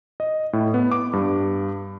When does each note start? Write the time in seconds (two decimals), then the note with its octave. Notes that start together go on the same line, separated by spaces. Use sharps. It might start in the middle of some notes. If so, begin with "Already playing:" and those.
0.20 D#5
0.53 A2
0.74 B3
0.92 D6
1.13 G2